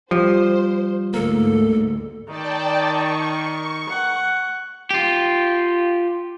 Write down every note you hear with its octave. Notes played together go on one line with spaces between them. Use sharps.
F3 G3 C5
D2 G#2 A#3 A4
D#3 D5 G5 A5
C#6
F#5
F4 G4